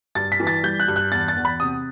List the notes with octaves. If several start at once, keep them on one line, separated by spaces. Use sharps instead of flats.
G2 A6
B6
E3
A6
G3 G6
F#6
G2
F#6
E2 A6
A6
E2
B5
C3 D#6